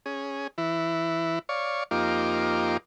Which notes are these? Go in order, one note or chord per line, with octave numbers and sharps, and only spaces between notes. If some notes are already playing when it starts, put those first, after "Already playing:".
C#4 G#4
E3 E4
C#5 D5 F5 C#6
F2 A#3 D#4 F4 G4 D6